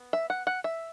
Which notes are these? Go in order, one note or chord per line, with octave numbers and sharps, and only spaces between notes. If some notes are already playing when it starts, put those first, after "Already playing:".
Already playing: B3
E5
F#5
F#5
E5